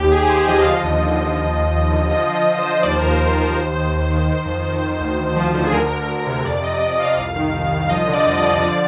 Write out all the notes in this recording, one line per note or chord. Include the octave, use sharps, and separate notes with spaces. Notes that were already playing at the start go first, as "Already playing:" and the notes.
Already playing: D#2 G4
D#2 G#4
D#2 C5
F3 D#5
D3 F5
D#5
D#2
F3
F3
D#2
D#2
D#2
D3
F3 D#5
F3
D#5
F3
C5
F3
D#2 D5
C5
D#2 A#4
C5
D#2
F3
D#2
D#3
D#2
D#3
D#3
F2
D#3
D#3
D2
D2
F3
D3
G#4
D2 A#4
D2
D2
C3
F2 D5
F2 D#5
F2 D#5
F2 F5
C2 F5
D#3
C2
C2
F5
F3 D#5
D3
D5
F2 D#5
D5
D3
F3